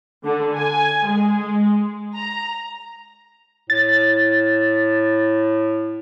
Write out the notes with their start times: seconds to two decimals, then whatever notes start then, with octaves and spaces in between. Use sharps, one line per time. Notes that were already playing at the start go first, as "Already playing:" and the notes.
0.23 D3
0.53 G#5
1.07 G#3
2.14 A#5
3.70 A2 A6